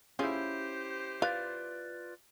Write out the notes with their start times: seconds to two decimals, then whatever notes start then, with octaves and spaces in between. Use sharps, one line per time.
0.19 C#4 E4 F4 G4 G#4 C5
1.22 F4 B4 D5 F5